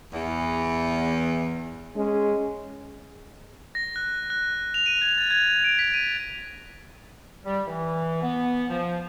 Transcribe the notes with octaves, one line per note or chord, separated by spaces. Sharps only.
E2
G#3 C#4
A#6
F#6
F#6
F7
D#7
G#6
A6
G#6
D7
B6
D#7
G3
E3
B3
F3